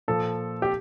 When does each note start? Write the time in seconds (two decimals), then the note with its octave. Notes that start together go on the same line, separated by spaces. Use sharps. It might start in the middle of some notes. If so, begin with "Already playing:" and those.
0.08 A#2 F3 A4
0.62 G4